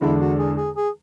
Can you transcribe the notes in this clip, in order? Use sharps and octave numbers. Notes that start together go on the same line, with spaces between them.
E2 D3 G#3 D4 E4 A4
F#4
G#4
G#4
G#4